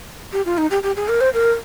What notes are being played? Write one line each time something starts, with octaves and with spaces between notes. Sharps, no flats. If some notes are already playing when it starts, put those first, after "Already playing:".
G4
F4
D#4
G4
G4
G#4
A#4
C5
A#4